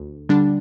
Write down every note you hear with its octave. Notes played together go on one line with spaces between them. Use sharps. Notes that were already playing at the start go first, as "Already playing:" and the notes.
Already playing: D2
D3 G3 D4